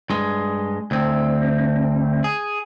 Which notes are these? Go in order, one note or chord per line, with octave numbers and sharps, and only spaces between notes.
G2 G#3
D2 C4
G#4